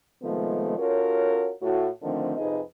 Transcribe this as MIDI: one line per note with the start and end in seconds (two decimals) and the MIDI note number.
0.23 0.75 48
0.23 0.75 51
0.23 0.75 53
0.23 0.75 56
0.23 0.75 57
0.23 0.75 59
0.78 1.51 61
0.78 1.51 65
0.78 1.51 66
0.78 1.51 69
0.78 1.51 70
0.78 1.51 73
1.62 1.87 45
1.62 1.87 66
2.02 2.35 50
2.02 2.35 51
2.02 2.35 53
2.02 2.35 57
2.02 2.35 60
2.02 2.35 62
2.38 2.59 41
2.38 2.59 48
2.38 2.59 63
2.38 2.59 68
2.38 2.59 71
2.38 2.59 75